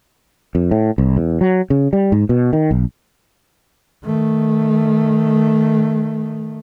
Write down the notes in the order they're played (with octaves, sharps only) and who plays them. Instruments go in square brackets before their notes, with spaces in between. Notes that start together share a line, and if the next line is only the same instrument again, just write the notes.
[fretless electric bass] F2
A2
C2
E2
F#3
C#3
G3
G#2
B2
D#3
B1
[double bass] D#3 A3